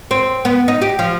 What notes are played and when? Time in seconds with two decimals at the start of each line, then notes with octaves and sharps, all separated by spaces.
0.11 C4
0.45 B3
0.68 D#4
0.82 G4
0.99 F3